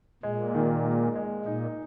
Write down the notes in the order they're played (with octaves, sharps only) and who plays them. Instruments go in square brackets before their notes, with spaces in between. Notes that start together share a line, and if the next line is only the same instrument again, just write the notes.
[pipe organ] A#2 [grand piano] G#3
[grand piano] D#3
G#3
G#3
[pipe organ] A#2 [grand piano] D#4